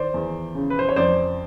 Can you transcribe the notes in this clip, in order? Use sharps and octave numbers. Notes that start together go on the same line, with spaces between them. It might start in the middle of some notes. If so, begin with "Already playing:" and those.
Already playing: D#3 C5 D5
E2
C#3
B4
C5
C#5
F2 C5 D5